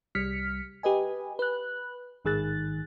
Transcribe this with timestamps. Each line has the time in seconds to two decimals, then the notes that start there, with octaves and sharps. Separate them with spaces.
0.15 C2 G3 F6 B6 C#7
0.83 G4 B4 D#5 G#5
1.39 B4 F#6
2.25 A1 G#2 D#3 G#4 F#6 A6